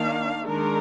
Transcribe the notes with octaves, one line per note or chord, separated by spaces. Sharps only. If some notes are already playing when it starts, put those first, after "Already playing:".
Already playing: D#3 A#3 D4 F5
D#3 G#3 D4 A#4